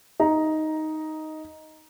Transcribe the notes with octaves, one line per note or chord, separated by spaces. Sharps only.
D#4 A#5